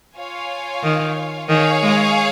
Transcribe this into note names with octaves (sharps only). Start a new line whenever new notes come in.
F4 C#5 F5 G#5
D#3
D#3 G#4 C#5 F5
G#3